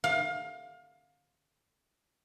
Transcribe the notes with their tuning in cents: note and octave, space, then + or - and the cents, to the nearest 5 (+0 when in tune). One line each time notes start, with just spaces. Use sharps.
F5 +30